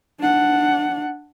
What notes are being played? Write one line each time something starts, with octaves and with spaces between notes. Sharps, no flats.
D4 F#5